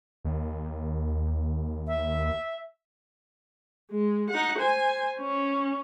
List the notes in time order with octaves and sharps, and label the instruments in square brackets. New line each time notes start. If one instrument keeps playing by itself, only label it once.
[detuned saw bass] D#2
[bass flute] E5
[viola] G#3
D#4 F#5
C5 G#5
C#4